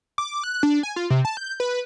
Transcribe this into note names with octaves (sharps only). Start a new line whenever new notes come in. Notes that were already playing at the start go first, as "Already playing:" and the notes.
D6
F#6
D4
G#5
F4
C3
A5
G6
B4